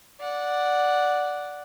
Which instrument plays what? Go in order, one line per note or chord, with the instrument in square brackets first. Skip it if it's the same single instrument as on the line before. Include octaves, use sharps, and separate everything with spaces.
[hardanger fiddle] D5 F#5